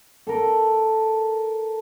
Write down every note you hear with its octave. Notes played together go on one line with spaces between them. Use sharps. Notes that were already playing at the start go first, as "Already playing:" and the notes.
A4 A#4